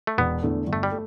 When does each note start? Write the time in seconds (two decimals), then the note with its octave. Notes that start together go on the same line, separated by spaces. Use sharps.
0.07 A3
0.18 E1 B3
0.43 E2 D3 A3
0.67 G1
0.73 A3
0.83 G3
0.91 A3